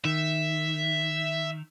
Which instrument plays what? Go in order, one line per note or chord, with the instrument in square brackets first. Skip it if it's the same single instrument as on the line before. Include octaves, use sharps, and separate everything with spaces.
[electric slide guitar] D#3 [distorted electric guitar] E5